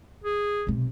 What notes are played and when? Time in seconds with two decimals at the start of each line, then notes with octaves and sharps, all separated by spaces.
0.24 G#4
0.67 B1 C3